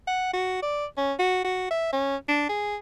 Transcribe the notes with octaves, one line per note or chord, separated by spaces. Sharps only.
F#5
F#4
D5
C#4
F#4
F#4
E5
C#4
D4
G#4